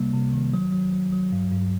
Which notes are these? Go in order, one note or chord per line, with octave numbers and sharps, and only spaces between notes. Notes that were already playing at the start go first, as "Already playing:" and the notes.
Already playing: C3 G3 A#3
C3
D#3
F#3
F#3
F#3
F#3
G2
G2